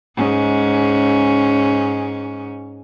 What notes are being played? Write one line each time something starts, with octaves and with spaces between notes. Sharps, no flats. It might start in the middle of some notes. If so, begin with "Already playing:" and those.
G#2 C#4